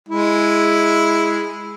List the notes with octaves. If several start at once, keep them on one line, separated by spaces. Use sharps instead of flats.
G#3 E4